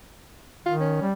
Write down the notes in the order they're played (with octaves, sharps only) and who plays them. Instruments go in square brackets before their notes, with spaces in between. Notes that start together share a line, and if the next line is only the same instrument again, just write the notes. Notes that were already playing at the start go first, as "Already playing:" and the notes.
[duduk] D#3 [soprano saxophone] F4
[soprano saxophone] C#4
[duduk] G3